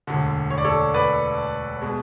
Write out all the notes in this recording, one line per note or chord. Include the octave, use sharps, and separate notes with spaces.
E1 D2 D3
C#5
D5
A4 C#5
B4 D5
B2 G#3